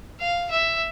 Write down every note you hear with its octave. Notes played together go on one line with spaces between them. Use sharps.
F5
E5